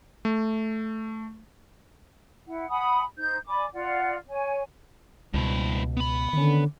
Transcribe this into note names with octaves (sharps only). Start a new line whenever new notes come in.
A3
E4 F#5
F#5 G#5 B5 D#6
D#4 C5 G6
D5 G#5 B5 D6
F4 D5 F#5
C#5 G#5
C#2 G2 B2 E4
B3 B5
D3 D#3 C#4